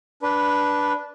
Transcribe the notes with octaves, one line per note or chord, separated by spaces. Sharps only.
D4 B4